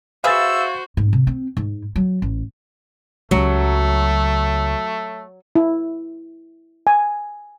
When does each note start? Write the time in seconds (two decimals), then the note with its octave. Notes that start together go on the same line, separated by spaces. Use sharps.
0.24 F#4 G#4 B4 C5 E5 F5 E6 A6
0.97 G#2
1.13 C3
1.27 C4
1.57 G#2
1.96 F#3
2.22 A1
3.31 C#2 F#3 A3
5.56 E4
6.87 G#5